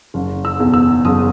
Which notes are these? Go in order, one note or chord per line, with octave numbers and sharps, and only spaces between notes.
F#1
E6
E2 B2
E6
F#1 D#6